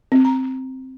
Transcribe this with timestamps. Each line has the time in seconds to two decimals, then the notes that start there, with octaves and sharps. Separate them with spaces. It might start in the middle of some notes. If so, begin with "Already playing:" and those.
0.12 C4
0.25 A#5